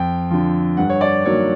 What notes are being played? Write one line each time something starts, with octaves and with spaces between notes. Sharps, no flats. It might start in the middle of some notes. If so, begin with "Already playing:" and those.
Already playing: F2 G5
D3 F3
G2 F#5
C#5
D5
D#3 F#3 A#3 C#5